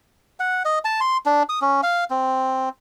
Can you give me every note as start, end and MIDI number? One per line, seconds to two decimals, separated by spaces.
0.40 0.63 78
0.65 0.79 75
0.85 1.00 81
1.01 1.17 84
1.26 1.43 62
1.49 1.59 87
1.62 1.81 61
1.83 2.04 77
2.10 2.69 60